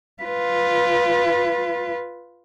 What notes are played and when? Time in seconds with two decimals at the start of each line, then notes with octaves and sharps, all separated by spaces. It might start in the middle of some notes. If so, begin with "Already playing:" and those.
0.23 F4 B4